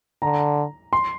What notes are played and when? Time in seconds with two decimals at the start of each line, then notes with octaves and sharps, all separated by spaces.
0.22 D3 A#5
0.93 C6